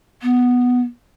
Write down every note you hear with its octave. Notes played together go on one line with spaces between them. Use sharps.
B3